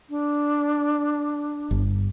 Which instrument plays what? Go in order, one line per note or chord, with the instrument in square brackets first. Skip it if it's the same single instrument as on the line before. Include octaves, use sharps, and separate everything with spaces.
[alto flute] D4
[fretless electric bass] G1